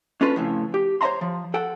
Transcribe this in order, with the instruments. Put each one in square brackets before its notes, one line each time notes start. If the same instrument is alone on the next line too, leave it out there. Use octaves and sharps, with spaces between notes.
[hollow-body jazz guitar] C#4 D4 F4 A4 B4
F2 A2 C#3
G4
C5 C#5 E5 A#5 C6
F3
A4 F#5 G5